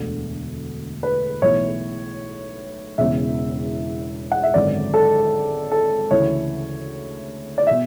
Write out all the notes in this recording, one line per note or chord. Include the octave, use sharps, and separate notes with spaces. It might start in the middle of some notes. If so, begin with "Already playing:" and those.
Already playing: E1 D2 D3
B4
B1 A2 E3 C#5
E1 E2 C#3 E3 E5
F#5
E5
G#1 F#2 D3 D5
A4
A4
D2 C#3 E3 C#5
D5
B2 E5